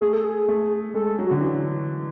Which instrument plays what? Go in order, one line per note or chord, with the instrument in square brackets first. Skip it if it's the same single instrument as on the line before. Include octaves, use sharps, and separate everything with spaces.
[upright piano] A3 [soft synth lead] G#4
[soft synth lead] A4
G#4
[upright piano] A3
[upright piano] G#3 [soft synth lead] A4
[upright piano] F#3
[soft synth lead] F#4
[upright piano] D3
E3